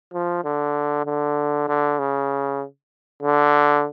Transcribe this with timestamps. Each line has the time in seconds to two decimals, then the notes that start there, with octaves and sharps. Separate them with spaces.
0.13 F3
0.44 D3
1.06 D3
1.68 D3
1.99 C#3
3.22 D3